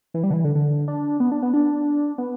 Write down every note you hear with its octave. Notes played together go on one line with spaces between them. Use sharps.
E3
G3
D3
E3
D3
D3
D4
B3
D4
B3
D4
B3